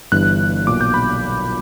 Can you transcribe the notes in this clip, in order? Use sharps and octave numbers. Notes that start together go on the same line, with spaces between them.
G1 G2 E3 F#6
B1 A#2 D6
G6
B5